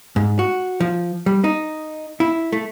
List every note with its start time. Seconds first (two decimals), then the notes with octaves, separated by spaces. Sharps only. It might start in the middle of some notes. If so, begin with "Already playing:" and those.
0.16 G#2
0.39 F#4
0.80 F3
1.26 G3
1.44 D#4
2.20 E4
2.53 A3